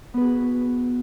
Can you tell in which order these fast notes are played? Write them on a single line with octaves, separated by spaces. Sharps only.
B3 B4 G#4 F#4